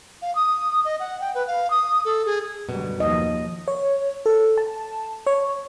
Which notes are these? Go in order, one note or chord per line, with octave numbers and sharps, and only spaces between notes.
F5
D#6
D#5
F#5
G5
B4
F5
D#6
A4
G#4
F#2 B2 D3 G3 G#3
D#2 F3 D#5
C#5
A4
A5
C#5